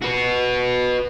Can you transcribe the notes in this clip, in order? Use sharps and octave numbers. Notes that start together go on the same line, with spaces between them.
F#4 B4